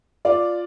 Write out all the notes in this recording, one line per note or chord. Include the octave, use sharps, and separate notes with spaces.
F4 D5 F5